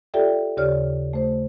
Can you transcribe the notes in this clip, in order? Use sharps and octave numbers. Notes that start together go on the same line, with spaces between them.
F4 G4 A4 D5 E5 G5
D#2 C#3 G4 C#5 D5 F6
A3 C5